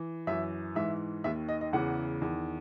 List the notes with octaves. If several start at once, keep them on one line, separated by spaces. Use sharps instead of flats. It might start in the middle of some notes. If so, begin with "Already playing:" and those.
Already playing: E3
F#2 E3 E5
G#2 E3 E5
D#2 D#3 E5
D#5
D#5
E2 C#3 E3 F#5
E2 D#3